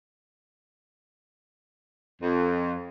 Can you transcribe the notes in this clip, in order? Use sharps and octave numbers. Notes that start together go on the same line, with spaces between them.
F2